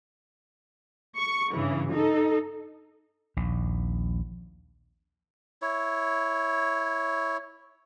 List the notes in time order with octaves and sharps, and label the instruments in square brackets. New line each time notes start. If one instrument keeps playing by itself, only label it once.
[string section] C#6
G2 C#3 E3
D#4 A4
[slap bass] A#1 D#2
[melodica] E4 C#5